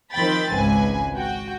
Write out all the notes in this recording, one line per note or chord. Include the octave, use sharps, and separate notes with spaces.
D#3 F3 C4 G5 B5 A6
G#1 C#2 B4 G#5
F#4 G5